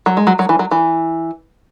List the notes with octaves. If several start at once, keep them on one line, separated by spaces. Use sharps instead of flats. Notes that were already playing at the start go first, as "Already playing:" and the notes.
F#3
G#3
F#3
F#3
E3
F#3
E3